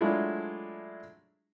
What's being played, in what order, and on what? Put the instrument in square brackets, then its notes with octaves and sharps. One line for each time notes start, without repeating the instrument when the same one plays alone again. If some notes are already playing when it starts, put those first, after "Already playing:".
[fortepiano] F#3 G#3 A3 D4 E4 F4